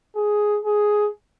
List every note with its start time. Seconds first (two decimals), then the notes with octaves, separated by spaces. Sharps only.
0.16 G#4
0.65 G#4